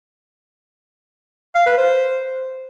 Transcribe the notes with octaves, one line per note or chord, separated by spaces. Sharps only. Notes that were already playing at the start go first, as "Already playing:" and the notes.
F5
B4
C5